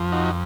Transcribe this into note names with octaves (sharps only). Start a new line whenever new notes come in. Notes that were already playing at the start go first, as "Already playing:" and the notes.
Already playing: F2 F3
D#4 F#4